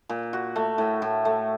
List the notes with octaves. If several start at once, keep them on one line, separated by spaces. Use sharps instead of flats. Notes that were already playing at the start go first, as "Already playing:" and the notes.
A#2
F#4
A3
A2
A2
A3